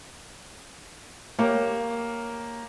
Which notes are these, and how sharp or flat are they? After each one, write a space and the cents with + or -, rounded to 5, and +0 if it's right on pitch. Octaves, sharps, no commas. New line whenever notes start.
A#3 +0 G4 +0 C#5 +0